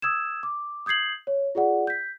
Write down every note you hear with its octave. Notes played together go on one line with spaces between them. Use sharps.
D#6 E6 G#6 E7
D6
D#6 G6 G#6 C7 F#7
C#5
F4 G#4 D5 F#5
G6 B6